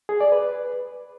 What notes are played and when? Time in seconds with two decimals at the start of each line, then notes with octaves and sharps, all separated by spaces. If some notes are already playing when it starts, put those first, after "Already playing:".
0.09 G#4
0.21 D5
0.32 B4